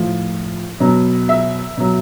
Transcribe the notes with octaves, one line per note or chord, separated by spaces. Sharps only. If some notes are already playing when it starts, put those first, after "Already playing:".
Already playing: A2 F3
B2 F#3
E5
B2 F#3